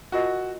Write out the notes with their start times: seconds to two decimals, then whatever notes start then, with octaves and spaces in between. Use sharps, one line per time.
0.12 F4 F#4 A#4 D#5 G#5